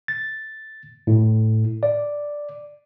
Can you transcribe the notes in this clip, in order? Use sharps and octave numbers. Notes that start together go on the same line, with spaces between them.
A6
A2
D5